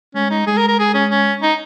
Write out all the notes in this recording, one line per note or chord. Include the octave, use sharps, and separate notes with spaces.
G#3 C#4
D#4
G#3 G#4
A#4
A#4
G#4
C#4
C#4
D#4